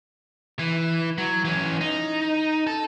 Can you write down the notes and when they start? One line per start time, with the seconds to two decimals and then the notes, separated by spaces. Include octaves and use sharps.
0.59 E3
1.18 F#3
1.45 E3 C#4
1.81 D#4
2.67 A4